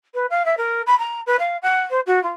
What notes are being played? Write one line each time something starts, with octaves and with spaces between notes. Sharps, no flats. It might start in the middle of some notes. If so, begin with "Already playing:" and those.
B4
F5
E5
A#4
B5
A#5
B4
F5
F#5
C5
F#4
F4